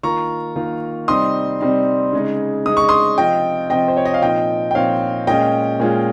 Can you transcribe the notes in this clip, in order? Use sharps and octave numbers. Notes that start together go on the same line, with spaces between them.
D#3 A#3 F4 A#5 C#6
D#3 A#3 F4
C3 G3 C4 D#4 C6 D#6
C3 G3 C4 D#4
C#3 G#3 D#4
C#3 G#3 D#4 D#6
C#6
C6 D#6
C3 F3 C4 F4 D#5 G5
C3 F3 C4 F4 D#5 G5
C5
C#5
D#5
F5
A#2 F3 C4 D#4 D#5 G5
G5
A#2 F3 C4 D#4 C#5 F5
A#2 G#3 C#4 F4 D#5 G5
A#2 G#3 C#4 F4